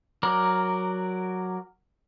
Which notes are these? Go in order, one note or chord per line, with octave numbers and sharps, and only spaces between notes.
F#3 A#4 D5